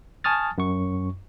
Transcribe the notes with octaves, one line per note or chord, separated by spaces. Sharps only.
G#5 A5 C#6 D#6 F6 A6
F#2 C#6